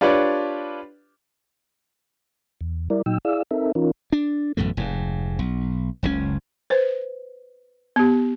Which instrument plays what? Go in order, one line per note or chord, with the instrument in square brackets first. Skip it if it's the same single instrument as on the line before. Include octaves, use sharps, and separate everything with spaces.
[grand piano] D4 F4 G4 B4 C#5 D5
[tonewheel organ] E2
G3 E4 A#4 D5
A#2 F#3 D#4 G5 E6
E4 G#4 D5 F5 E6
C4 D#4 A4 A#4 E5
E3 C#4 D#4 F4 A#4
[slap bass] D4
A1 F#2 B2 A3
F1 G#2
B1
F#1 C#2 A#2 C#4
[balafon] B4 C5
B3 G4